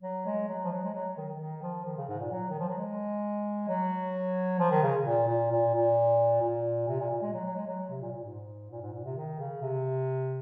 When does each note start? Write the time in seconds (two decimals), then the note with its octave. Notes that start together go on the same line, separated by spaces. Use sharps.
0.03 F#3
0.26 G#3
0.49 F#3
0.64 F3
0.72 F#3
0.83 G#3
0.94 F#3
1.17 D#3
1.29 D#3
1.40 D#3
1.62 F3
1.85 D#3
1.97 C#3
2.09 G#2
2.20 A#2
2.32 F#3
2.50 D#3
2.59 F3
2.68 F#3
2.77 G#3
3.68 F#3
4.59 F3
4.71 D#3
4.83 C#3
5.05 A#2
5.27 A#2
5.51 A#2
5.74 A#2
6.41 A#2
6.88 C3
7.00 A#2
7.10 A#2
7.22 G#3
7.34 F#3
7.45 F#3
7.56 G#3
7.67 F#3
7.79 F#3
7.90 C3
8.01 A#2
8.13 A#2
8.24 G#2
8.71 A#2
8.81 G#2
8.93 A#2
9.04 C3
9.16 D#3
9.39 C#3
9.62 C3